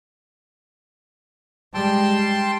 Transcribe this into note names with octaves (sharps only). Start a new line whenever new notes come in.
G3 G#3 G5 A5 C6